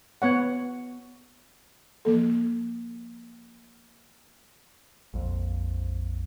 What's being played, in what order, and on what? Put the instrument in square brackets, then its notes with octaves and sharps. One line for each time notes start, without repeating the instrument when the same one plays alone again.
[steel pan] B3 C#5 F#5
[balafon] F3 A#3 A4
[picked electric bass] A#1 F2